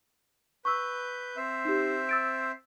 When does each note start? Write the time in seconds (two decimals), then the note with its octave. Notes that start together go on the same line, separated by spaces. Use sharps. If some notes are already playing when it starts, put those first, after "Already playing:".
0.65 B4 C#6 E6 G6
1.37 C4 C5 E5
1.65 D#4 G4
2.09 E6 A6 D7